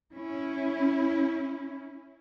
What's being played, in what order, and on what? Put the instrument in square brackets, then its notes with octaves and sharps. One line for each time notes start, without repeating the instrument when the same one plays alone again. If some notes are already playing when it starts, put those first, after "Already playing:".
[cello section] C#4 E4